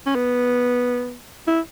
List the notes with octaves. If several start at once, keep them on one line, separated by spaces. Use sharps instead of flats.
C#4
B3
E4